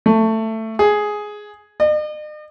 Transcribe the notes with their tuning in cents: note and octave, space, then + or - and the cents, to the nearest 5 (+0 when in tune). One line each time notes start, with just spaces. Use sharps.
A3 +15
G#4 +5
D#5 -45